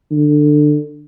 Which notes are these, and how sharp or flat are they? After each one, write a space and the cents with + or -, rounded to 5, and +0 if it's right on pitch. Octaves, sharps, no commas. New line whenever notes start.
D3 +20